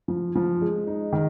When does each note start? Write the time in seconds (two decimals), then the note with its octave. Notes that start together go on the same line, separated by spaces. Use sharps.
0.08 F3
0.35 F3
0.61 G#3
0.87 D#4
1.13 D#3